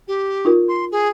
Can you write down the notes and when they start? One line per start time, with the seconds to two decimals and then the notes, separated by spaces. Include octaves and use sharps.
0.07 G4
0.45 D#4 F4 A#4
0.68 C6
0.91 G#4